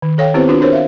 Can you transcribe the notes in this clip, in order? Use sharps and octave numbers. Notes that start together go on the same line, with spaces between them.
D#3
A4 C#5 F5 G5
B3 C4 E4 G4 B4 C5
D4 F4 F#4 B4
D4 A#4 C5 C#5
E5 F5